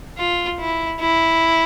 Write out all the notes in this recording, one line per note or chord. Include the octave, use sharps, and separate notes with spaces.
F4
E4
E4